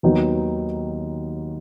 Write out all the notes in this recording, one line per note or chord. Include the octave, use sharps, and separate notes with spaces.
D#2 D#3 F#3 B3 D#4